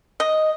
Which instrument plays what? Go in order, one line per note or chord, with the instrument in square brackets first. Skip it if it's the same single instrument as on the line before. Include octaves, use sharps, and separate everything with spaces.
[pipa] D#5